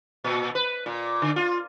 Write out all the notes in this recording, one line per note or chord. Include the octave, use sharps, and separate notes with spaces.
A#2
B4
A#2
D3
F4